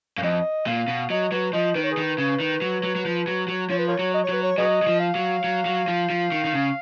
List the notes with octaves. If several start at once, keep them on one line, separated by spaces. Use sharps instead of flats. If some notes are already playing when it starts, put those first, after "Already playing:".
F#2 F5
F2 D#5
A#2 F5
B2
F#3 D#5
F#3 B4
F3 D#5
D#3 B4
C#5
G#4 B4
D#3
C#3
D#3
F#3
F#3
F#3
F3
F#3
F#3
F3 C#5
B4
F4 A#4 C#5
F#3
D#5
C#5
F#3 B4
C#5
F#3 G#4 B4 D#5
F#3
F3
F5
F#3
F#3
F#3
F3
F3
D#3
D#3
C#3